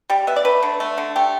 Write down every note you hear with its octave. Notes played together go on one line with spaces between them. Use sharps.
G3 G4
B3 E5
D5
A3 B4
D3
A3
D3
A3 G4